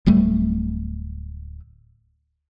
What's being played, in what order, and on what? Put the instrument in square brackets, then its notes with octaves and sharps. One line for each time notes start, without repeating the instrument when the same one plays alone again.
[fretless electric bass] D1 G3 A3